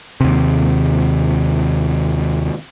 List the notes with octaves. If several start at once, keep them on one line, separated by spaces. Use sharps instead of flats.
D#2 C3